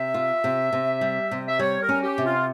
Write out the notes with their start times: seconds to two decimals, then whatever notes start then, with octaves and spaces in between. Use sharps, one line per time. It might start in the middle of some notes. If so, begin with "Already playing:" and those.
Already playing: C3 E5
0.14 F4
0.44 C3
0.73 C3
1.01 G3
1.31 C3
1.48 E5
1.59 G3 C#5
1.82 A#4
1.89 C#4
2.03 G4
2.18 C3
2.25 F4